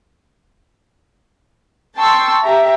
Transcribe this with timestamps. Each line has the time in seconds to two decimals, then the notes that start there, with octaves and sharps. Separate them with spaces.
1.97 G5 A5 C6 C#6 E6
2.42 G4 E5 A#5